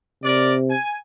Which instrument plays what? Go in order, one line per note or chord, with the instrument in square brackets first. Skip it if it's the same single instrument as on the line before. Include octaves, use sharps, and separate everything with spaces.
[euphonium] C3 [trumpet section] A#4 D5
[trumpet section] G#5